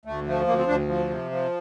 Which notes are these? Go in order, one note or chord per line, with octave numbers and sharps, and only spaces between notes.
D2 A3
F3 A3
D2 A#3
C4
D2 D4
F3
C3
F3